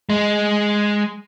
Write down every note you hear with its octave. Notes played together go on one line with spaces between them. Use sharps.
G#3